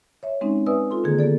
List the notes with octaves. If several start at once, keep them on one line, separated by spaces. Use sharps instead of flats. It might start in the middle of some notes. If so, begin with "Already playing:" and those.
C#5 E5
G#3 C4 C#4 D#4
B4 D5 E5 G#5 D#6 E6
F4 A4 C6
D3 D#3 A#3 G#4
B3 G4 A4 D5